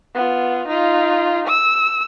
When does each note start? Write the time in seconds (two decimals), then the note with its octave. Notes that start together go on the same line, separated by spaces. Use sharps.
0.15 B3 F4
0.68 D#4 F4
1.47 E6